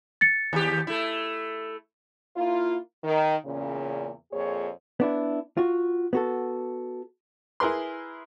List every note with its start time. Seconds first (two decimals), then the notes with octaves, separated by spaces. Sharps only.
0.21 A6 C#7
0.53 D#2 G4
0.87 A3 E4
2.37 A#3 E4 F4
3.04 D#3
3.45 E2 A#2 C#3
4.32 F2 A#2 G#4 C#5
5.00 B3 D4 E4
5.57 F4 F#4
6.13 B3 F#4 A4
7.60 E4 G#4 A#4 B4 C6